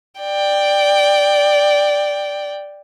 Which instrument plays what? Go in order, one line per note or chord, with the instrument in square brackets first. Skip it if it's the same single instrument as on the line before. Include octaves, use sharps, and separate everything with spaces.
[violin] D5 G5